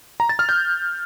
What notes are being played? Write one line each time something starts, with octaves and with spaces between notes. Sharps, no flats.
A#5
A6
F6
G6